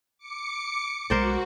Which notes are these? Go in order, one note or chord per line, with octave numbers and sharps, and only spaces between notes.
D6 C#7
B1 D#3 G#3 F#4 A#4 C5 D5